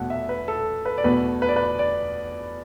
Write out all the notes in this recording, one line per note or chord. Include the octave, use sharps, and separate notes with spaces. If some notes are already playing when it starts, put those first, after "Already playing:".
Already playing: E2 B2 A3 F#5
E5
B4
A4
B4
D5
E2 B2 A3 B4
B4
D5
B4
D5